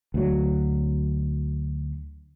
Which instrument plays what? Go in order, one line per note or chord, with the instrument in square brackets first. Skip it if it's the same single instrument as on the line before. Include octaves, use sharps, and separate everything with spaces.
[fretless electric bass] D2 F#3